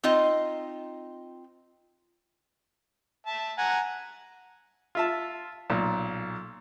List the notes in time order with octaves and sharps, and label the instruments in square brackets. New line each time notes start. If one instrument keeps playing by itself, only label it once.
[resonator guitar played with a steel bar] C4 D#4 F4 D#5
[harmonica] E5 A5
F#5 G#5 A#5
[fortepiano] F4 E5 A5
B1 A#2